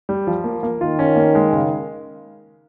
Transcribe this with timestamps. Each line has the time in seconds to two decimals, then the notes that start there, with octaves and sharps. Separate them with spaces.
0.09 G3
0.27 F3
0.44 A#3
0.63 A#3
0.80 D#3 F4
0.99 C#4
1.16 A#3
1.35 G#3
1.52 C#3